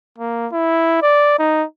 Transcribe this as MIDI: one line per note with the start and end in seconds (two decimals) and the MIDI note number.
0.18 0.48 58
0.52 0.98 64
1.02 1.35 74
1.39 1.64 63